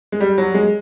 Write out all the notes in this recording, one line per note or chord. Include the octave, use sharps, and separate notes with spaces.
G#3
G3
F#3
G#3